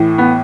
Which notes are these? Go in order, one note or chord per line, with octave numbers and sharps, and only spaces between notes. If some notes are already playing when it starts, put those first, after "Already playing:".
Already playing: A2 E3
B3